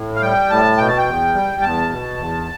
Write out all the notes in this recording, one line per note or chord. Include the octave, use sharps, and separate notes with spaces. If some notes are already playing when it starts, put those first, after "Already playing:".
Already playing: A2
F5
G3 G5
A2 A5
B2 G5
A5
G5
E2
G3
E2 A5
B2
E2